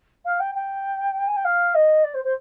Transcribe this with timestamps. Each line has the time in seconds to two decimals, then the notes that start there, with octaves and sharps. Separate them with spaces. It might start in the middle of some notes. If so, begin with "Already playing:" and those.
0.25 F5
0.40 G5
0.55 G5
1.27 G#5
1.36 G5
1.44 F5
1.74 D#5
2.04 D5
2.14 C5
2.24 C5